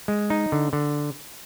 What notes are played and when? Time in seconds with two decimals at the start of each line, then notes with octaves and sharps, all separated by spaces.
0.08 G#3
0.30 D#4
0.52 D3
0.73 D3